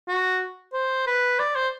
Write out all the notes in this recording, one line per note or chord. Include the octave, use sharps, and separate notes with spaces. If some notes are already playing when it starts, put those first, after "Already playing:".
F#4
C5
B4
D5
C5